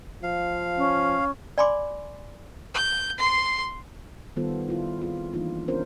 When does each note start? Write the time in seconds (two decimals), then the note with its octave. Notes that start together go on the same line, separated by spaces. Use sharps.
0.23 F3 F5
0.77 C#4
1.58 D5 G#5 B5 C6 D6
2.74 G6
3.18 C6 C7
4.36 D#3 G3 B3 F4 A4 C5
4.69 E4 F4
5.00 C4 F4 G#4
5.33 E3 G3 A#3 D4 D#4 F4
5.68 B3 C#4 D4 F4 A#4 C5